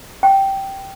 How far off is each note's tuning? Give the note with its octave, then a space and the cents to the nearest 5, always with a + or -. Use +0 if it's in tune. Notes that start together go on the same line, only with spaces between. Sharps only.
G5 -10